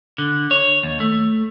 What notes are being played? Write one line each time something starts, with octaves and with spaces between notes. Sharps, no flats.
D3
C#5
D#2
A3